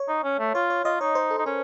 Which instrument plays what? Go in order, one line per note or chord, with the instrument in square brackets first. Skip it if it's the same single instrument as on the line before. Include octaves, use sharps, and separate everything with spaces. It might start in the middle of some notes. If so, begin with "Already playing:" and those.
Already playing: [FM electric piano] C#5
[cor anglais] D#4
C#4
A3
[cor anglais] F4 [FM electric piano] C#5
[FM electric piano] C#5
[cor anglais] F4 [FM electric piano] D#5
[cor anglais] D#4 [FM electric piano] C#5
[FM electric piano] C5
A4
[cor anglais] D#4
[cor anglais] C#4 [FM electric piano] A#4